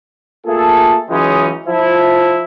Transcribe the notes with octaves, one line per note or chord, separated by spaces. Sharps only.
A3 A#3 F4 G#4 A4
C#2 E3 F#3 G#3 C#4 D#4
F3 E4